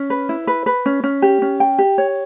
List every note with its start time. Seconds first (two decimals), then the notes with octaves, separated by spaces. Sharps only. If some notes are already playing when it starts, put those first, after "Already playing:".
Already playing: C#4
0.10 B4
0.29 E4
0.47 B4
0.66 B4
0.86 C#4
1.04 C#4
1.22 G4
1.42 C#4
1.60 G5
1.78 G4
1.98 C#5